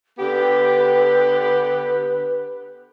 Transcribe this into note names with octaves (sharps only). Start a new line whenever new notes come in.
D3 B3 G4 B4